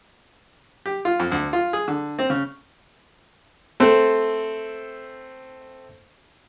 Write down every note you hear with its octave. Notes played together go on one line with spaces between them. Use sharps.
G4
F4
F2
D2
F4
G#4
D3
C4
C#3
A3 C4 A4